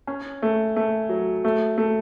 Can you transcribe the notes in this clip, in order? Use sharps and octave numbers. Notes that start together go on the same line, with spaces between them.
C#4
A3
A3
F#3
A3
A3